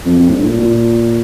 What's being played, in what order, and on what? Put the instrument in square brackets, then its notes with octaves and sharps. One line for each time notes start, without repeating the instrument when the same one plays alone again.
[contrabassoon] F2
F2
A2
G2
A2
A#2
A#2